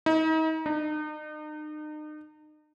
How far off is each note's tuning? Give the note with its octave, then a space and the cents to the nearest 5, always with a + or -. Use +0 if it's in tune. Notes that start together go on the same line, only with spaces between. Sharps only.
D#4 +35
D#4 -40